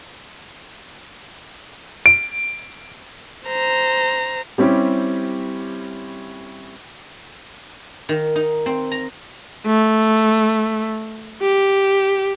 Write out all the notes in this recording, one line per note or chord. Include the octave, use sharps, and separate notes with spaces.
D7
C5 A#5
G3 C4 C#4 E4 G4
D#3
D#4
C4
A#5
A3
G4